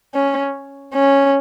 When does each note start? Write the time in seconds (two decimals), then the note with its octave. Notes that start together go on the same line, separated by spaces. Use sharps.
0.14 C#4
0.93 C#4